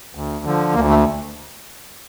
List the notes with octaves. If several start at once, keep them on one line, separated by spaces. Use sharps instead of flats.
D2
D3 F3
D2 A#3
A3